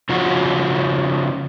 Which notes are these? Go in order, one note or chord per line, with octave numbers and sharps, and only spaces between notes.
C#3 F3 C#4 F#4